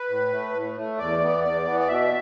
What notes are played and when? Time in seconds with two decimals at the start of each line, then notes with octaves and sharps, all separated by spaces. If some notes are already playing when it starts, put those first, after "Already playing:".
Already playing: B4
0.09 A2
0.32 A3
0.54 A2
0.77 A3
0.99 E2 D5
1.21 E3 B3
1.43 E2 D5
1.66 E3 B3
1.80 D5
1.88 B2 E5